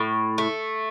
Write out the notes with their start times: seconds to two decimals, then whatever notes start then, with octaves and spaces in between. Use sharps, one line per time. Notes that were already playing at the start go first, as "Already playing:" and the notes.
Already playing: A2
0.38 A3